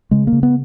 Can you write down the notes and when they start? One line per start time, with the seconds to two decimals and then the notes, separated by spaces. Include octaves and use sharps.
0.11 C#3 G#3
0.27 A#3
0.32 C#3
0.43 B3